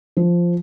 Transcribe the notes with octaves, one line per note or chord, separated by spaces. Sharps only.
F3